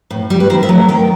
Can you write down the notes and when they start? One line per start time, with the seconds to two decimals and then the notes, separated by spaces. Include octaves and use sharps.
0.10 A2
0.30 G3
0.40 B4
0.50 D#3 C5
0.63 E5
0.69 F#3 A3
0.89 D#3 G5